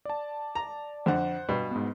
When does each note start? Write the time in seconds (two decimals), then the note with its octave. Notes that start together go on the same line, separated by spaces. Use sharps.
0.05 D5 A5
0.55 A#5
1.06 F2 D3 C5 F#5
1.49 G2 B2
1.71 G#2 B3